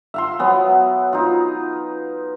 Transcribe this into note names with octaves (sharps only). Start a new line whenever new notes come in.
E5 F5 C6
F#3 B3 G#5
D#4 F4